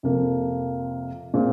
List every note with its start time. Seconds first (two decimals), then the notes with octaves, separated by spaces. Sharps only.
0.03 F2 C3 F3 A#3
1.34 A#2 G#3 C4 F4